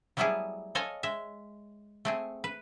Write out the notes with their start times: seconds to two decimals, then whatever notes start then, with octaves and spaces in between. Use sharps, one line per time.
0.17 F#3 G3 A3 B3 E4 G#4
0.75 A4 C#5 D#5 F5 G#5
1.03 G#3 E5
2.05 A3 C4 G#4
2.44 B4